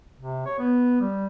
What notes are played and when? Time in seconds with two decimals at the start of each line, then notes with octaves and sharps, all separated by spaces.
0.20 C3
0.46 C#5
0.59 B3
1.01 G3